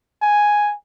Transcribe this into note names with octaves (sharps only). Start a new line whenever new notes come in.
G#5